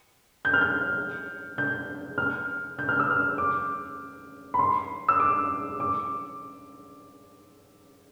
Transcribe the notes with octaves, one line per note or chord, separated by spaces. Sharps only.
G6
F6
G6
G6
F6
G6
F6
E6
F6
D6
B5
C6
E6
D6
D6